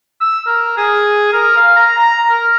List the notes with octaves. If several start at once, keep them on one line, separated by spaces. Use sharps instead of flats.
E6
A#4
G#4
A#4
F5
A#5
A#5
A#4